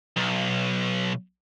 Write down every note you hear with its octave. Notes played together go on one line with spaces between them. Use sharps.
B1